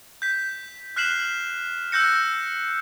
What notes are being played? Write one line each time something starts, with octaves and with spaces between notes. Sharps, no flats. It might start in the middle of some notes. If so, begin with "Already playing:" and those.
G6 B6
F6 F#6 B6 C7 E7 F#7
E6 F#6 G6 A#6 C#7